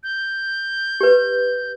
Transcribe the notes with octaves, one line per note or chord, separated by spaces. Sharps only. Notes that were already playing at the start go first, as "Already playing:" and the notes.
G6
G4 B4